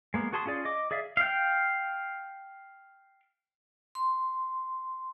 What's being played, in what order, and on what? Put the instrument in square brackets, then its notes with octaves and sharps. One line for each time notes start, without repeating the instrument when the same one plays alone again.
[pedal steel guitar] G#3 A#3 B3
F#4 G#4 A5 C6 D#6
C#4 F4 G#4 D5
D#5 D6
G#4 D5 E5 F5
F5 G5
[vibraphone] C6